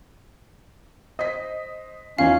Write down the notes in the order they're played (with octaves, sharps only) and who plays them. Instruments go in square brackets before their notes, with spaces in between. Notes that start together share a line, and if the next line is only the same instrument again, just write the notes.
[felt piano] C5 B6 [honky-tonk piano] D#5
[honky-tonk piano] E2 E3 D#4 [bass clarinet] C#4 [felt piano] F4 C#5 [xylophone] F5